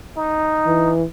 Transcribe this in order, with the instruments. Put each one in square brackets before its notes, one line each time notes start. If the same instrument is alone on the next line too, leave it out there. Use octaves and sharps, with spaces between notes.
[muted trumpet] D#4
[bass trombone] E3